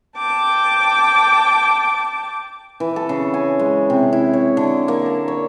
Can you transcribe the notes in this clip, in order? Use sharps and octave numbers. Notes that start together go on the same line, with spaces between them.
G5 A5 D6
E3
A4
C#3
G#5
G#3
C3
E4
C#5
D3
A#3
A5
C#5